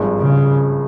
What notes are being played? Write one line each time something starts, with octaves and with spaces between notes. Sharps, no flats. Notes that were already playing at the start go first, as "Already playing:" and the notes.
Already playing: G#1 G2 F3 G#3
C#3